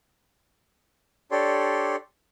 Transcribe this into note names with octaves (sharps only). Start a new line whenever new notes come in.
D4 G4 A4 C#5 D5 C6